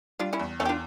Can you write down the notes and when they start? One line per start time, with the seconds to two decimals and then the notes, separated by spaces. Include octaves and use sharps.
0.19 G3 D4 F4
0.33 C#4 E4
0.40 E2
0.60 E2 A3 C#4
0.65 G4
0.69 D4 F4